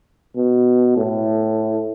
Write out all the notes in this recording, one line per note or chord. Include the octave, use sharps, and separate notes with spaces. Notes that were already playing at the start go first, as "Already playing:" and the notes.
B2
A2